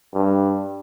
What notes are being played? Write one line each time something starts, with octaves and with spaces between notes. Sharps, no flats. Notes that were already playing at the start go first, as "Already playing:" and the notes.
G2